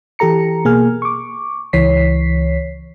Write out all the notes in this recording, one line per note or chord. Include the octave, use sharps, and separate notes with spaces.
E3 G4 A4 A#5 C#7
B2 A#3 G#4 G#5 F6
C#6 D6
C#2 E3 C#5 B6 C7